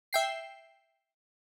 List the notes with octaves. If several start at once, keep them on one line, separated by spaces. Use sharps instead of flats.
E5 G5 C7